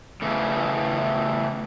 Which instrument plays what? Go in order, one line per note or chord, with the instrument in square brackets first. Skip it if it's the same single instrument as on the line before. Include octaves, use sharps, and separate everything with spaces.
[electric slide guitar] A2 C#3 E3